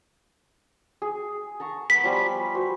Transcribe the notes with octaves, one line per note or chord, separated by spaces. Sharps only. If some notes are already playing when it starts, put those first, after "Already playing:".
G#4
A5 A#5 C#6
B3 A#5 B6
F3 G3 G#5
F#4 C5